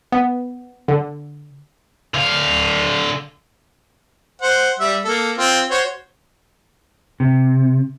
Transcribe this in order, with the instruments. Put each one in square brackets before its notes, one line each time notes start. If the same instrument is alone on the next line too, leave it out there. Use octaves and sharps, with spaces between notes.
[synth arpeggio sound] B3
D3
[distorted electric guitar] D3 F5
[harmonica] C5 F#5
G3 E5
A#3 A4
C4 F4
F#4 C5 C#5
[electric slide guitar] C3